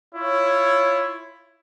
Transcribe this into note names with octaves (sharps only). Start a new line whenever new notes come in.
E4 F4 C#5